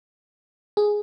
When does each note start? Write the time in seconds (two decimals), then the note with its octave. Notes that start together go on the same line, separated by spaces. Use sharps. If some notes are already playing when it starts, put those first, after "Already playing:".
0.77 G#4